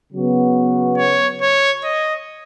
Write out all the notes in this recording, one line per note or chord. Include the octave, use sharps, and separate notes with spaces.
C#3 F#3 B3 F#4
C#5
C#5
D#5